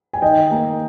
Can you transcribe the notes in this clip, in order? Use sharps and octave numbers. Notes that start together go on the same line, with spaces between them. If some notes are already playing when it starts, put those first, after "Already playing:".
G#5
D#3 D#5 G5
A#3